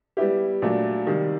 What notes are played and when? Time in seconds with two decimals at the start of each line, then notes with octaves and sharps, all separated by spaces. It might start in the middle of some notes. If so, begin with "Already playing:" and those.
0.17 G3 B3 E4 G4
0.62 A#2 F#3 A3 D4
1.07 C3 D#3 G3